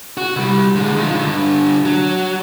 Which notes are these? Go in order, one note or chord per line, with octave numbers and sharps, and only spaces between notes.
F#4
C2 G3
D3 G#3
D#3 F3
G2 D3
F#3